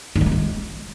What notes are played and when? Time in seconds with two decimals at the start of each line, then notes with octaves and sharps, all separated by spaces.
0.15 D#3
0.21 G3
0.26 A#3
0.32 B3
0.37 G#3